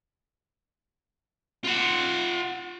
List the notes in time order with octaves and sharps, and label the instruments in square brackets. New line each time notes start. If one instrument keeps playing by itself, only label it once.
[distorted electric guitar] F4 F#5